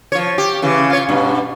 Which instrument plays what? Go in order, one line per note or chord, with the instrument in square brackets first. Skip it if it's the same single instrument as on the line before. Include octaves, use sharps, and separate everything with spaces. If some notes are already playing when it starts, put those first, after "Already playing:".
[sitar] F3 C#5
G4
C#3 E3
F4 C#5
G2 B2